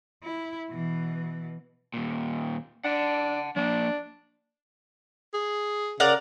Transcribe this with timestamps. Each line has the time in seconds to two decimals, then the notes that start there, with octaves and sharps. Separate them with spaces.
0.23 E4
0.71 B2 E3
1.94 D#2 A#2
2.85 D4 F#5 A5
3.56 F3 A#3 D4
5.34 G#4
6.00 C#3 A#4 D5 F#5